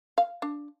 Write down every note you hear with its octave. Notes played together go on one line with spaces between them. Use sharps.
F5
D4